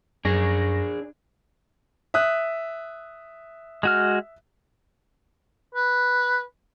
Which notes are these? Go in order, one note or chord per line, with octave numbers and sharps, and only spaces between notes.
F#2 D4 G#4 C#6 A#6
E5 D#6 F#6
G#3 F#4 F6
B4